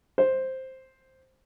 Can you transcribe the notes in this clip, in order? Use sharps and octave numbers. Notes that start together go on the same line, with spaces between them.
C5